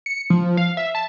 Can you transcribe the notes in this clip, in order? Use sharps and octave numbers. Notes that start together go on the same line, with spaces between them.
C#7
F3
F5
E5
A5